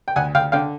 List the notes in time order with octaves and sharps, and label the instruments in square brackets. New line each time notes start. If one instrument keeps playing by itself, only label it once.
[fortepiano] G5
D2 F#5 G#5
D2 F5 G5
D3 F5 G5